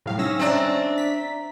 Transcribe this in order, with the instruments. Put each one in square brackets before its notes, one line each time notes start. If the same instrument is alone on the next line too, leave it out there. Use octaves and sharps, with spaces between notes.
[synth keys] A2 C3 F5 [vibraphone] F#3 G3
[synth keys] C#4 E6 A#6 [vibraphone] D#4
[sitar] C4 D4 [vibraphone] E5 A#5
[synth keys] B6